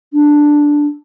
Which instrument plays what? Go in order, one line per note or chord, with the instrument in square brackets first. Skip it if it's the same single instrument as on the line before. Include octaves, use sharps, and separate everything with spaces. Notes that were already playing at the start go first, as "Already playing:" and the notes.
[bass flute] D4